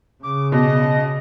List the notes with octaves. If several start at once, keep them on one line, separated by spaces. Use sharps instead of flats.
C#3 D6
B2 D#5